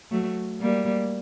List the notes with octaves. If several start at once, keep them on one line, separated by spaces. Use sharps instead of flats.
F#3 A3
G3 A#3